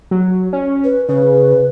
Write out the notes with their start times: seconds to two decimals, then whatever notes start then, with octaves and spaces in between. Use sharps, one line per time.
0.11 F#3
0.53 C#4
0.84 B4
1.09 C#3 B4